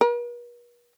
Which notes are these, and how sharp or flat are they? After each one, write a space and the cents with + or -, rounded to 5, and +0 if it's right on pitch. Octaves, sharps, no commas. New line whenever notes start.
B4 -45